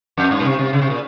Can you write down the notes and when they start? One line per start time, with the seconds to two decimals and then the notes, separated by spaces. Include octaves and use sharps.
0.18 F2
0.31 G2
0.40 A#2
0.45 C3
0.59 C3
0.73 C#3
0.82 C3
0.90 A#2